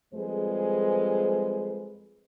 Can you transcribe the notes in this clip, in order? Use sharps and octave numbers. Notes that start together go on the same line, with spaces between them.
F2 G3 G#3 G#4 B4 C5